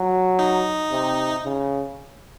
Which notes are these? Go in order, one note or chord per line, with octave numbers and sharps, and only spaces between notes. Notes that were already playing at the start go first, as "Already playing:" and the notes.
Already playing: F#3
D#4
C3
C#3